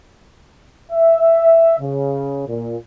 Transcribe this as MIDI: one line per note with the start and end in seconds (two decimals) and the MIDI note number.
0.92 1.76 76
1.79 2.46 49
2.47 2.76 46